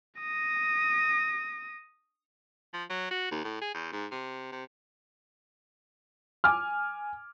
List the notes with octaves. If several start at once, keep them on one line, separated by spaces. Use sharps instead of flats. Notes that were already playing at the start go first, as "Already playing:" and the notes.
D#6 A#6
F3
F#3
F#4
D#2
A2
G#4
E2
G#2
C3
C3
G#5 D6 F6